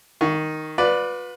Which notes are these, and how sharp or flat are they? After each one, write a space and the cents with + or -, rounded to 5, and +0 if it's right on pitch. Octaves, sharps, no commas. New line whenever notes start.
D#3 +0 C#6 +0
F4 +45 B4 +0 D5 +0